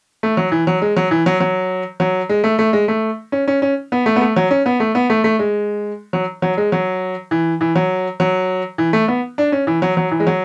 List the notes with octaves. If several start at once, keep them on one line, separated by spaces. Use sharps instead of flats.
A3
F#3
E3
F#3
G#3
F#3
E3
F#3
F#3
F#3
G#3
A3
A3
G#3
A3
C#4
C#4
C#4
B3
A3
B3
A3
F#3
C#4
B3
A3
B3
A3
A3
G#3
F#3
F#3
G#3
F#3
E3
E3
F#3
F#3
E3
A3
B3
D4
C#4
E3
F#3
F#3
E3
G#3
F#3